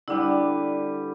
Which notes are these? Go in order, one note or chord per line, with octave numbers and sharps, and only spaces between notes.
D3 G3 D4 E4 B4